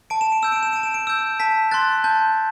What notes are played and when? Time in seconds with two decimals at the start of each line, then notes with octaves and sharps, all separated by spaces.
0.10 A5 D7
0.21 E7
0.32 D7
0.42 E6 G6 E7
0.52 D7
0.63 E7
0.73 A5 D7
0.83 E7
0.94 D7
1.07 E6 G6
1.40 A5 B6
1.71 C6 F#6 A6
2.04 A5 G6